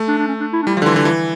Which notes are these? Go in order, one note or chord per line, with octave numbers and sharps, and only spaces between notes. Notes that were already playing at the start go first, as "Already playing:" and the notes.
Already playing: A3
D4
D4
C#4
D4
E4
D4
G3 E4
D3 F3
E3 F4
D3
E3 E4